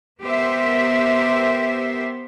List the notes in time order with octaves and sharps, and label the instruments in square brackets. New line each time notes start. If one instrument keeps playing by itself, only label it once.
[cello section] B3 G4 A#4 C5 E5